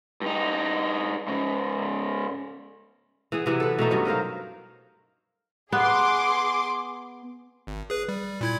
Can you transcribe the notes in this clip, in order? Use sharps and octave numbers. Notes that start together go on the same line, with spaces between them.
G2 D#4
G#2 C#3
E3 B3 G#4
C3 E3 F#3 B3
A4 B4
B2 A3 D#4 E5
G2 F#3 C#4
F#3 A#4 C5 F5
B3 G#4 C6 D6
G#1
G#4 B4
G3
A#2 E4 G#6